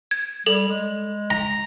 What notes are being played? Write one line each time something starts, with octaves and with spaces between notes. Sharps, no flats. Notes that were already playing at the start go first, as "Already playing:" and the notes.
G#6
G3 A4 F7 F#7
G#3
A#5